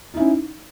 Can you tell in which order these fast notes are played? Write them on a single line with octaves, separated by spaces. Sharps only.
D#4 E4 C#4